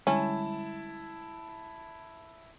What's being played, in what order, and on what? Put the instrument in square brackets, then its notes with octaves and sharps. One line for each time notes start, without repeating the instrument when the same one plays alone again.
[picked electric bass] D3 G3 G#3 [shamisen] C#4 [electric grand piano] E4 A5